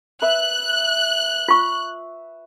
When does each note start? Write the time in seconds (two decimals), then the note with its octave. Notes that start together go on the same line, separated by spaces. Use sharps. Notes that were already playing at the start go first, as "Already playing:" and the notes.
0.22 B4 E5 F#6
1.48 F4 C#6